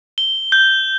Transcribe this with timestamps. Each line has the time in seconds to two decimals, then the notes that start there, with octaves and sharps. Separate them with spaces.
0.18 G7
0.52 G6